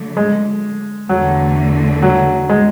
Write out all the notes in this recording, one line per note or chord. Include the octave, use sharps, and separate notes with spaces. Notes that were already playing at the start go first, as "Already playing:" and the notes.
Already playing: D3 F#3 A3
G#3
E2 D3 F#3 A3
F#3
G#3